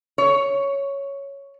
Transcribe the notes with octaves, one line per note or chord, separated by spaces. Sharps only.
C#5